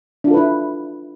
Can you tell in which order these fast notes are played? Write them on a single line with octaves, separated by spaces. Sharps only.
D4 F4 A4 B4 E4